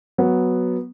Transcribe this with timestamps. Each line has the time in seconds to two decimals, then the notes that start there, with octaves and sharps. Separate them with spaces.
0.18 F#3 B3